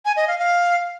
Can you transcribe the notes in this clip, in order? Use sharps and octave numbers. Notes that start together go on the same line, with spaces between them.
G#5
D#5
F5
F5